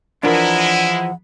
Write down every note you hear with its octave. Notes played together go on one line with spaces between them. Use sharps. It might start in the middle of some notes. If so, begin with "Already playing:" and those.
E3 F3 G#3 D4 E4 A#4 F#5 A#5